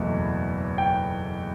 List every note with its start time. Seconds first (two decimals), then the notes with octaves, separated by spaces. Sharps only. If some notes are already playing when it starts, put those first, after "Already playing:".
Already playing: F#1 E2 B2 A3 E4
0.78 G5